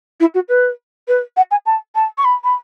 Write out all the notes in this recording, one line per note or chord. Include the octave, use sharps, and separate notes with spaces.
E4
F#4
B4
B4
F#5
G#5
A5
A5
C#6
B5
B5